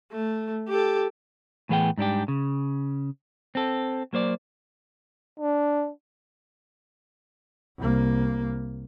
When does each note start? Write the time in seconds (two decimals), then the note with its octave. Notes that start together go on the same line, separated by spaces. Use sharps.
0.12 A3
0.69 G4 A4
1.69 A2 E3 B3 G#4 F5 G5
1.98 G#2 G3 D4 G4
2.28 C#3
3.55 C4 A4
4.13 F#3 A#3 C5 D5
5.40 D4
7.78 C2 A#3